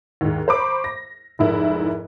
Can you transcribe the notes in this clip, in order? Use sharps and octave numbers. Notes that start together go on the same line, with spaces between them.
D#2 G#2
C5 A#5 B5 C#6 D6
A#6
F1 G#2 E4 A#4